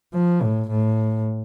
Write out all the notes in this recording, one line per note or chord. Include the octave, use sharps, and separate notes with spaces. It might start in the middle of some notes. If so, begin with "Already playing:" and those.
F3
A2
A2